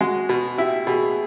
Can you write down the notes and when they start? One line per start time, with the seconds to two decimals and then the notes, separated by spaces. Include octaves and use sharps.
0.01 G#3 F#4
0.29 B2
0.58 E4 G4
0.87 B2 G#4